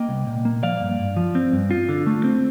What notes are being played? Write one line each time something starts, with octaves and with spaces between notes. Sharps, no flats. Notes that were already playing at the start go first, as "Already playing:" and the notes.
Already playing: A#3 D#5 G5
C2
A#2
A#3
F3 D5 F5
G2
G2
F3
C4
G2
F4
D3
A3
C4